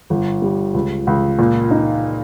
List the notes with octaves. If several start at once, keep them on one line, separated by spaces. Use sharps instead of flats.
G1
G3
C#2
C#2
A#2
D#4